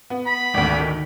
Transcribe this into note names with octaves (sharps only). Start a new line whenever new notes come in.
B3
B5
G#1 D2
D#3